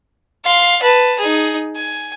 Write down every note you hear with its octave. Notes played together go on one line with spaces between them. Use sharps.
F5 C6
B4 A5
D#4 G#4
G#5